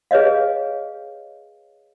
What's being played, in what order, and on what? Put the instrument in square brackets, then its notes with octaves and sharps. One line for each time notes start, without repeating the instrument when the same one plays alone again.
[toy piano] G#4 B4 C#5 D#5 F5